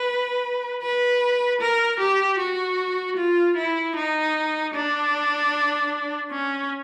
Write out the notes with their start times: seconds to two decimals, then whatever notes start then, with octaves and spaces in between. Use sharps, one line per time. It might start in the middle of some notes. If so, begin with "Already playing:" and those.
Already playing: B4
0.82 B4
1.61 A#4
2.00 G4
2.39 F#4
3.17 F4
3.56 E4
3.96 D#4
4.74 D4
6.31 C#4